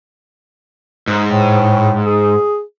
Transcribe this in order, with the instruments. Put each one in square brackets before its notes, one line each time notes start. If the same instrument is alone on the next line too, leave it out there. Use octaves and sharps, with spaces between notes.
[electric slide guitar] G#2
[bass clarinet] A2
G#4